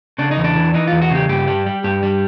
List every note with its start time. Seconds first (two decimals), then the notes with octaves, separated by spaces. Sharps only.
0.18 C#3 D4
0.31 D#4
0.37 E2
0.44 D4
0.56 E3
0.74 E3 D#4
0.87 E2 F4
1.02 F#4
1.11 C#3 G4
1.29 G2 G4
1.48 G3
1.66 G3
1.84 G2 G4
2.03 G3